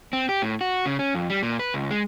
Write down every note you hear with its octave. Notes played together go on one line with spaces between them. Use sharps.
C4
G4
A2
F#4
C#3
C#4
F2
G3
A#2
B4
C#2
G#3